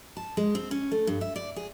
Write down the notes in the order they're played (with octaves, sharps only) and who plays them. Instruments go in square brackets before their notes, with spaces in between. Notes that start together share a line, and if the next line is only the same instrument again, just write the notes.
[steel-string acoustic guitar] A5
G#3
C4
C#4
A3
G2
E5
D5
G#4